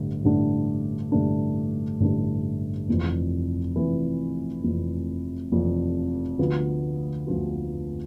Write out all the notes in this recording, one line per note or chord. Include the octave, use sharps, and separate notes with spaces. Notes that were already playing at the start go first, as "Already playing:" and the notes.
Already playing: A1 G2 D3 A3 D4
A1 G2 D3 A3 D4
A1 G2 D3 A3 D4
A1 G2 D3 A3 D4
F1 F2 E3
F1 F2 E3
F1 F2 E3
F1 F2 E3
D2 D3 F3 B3 F4
D2 D3 F3 B3 F4